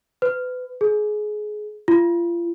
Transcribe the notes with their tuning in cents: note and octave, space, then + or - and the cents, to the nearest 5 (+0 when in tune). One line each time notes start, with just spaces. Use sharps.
B4 +30
G#4 +25
F4 -35